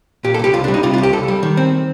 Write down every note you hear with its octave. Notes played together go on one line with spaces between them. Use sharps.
A#2 G4
A4
C2 G4
C2 F4
D4
G3
D#4
C3 F4
F4
C2
G4
C2 A4
G3
D#3
C4